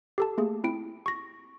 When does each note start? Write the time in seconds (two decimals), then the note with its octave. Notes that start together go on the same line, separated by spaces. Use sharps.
0.18 G4 A4 A5
0.38 A3 A#3 G#4
0.64 C4 E4 D7
1.06 C#6 A#6